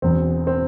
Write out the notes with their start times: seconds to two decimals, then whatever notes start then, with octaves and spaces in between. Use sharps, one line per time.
0.02 E1 E2 B2 C4
0.47 C4